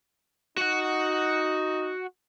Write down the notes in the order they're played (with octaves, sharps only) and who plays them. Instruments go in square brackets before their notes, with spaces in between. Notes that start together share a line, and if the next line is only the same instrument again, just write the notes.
[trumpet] D#4 [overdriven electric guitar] F#4 F#5